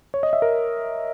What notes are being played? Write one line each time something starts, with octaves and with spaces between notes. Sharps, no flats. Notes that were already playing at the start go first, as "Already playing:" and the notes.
C#5
D#5
E5
A#4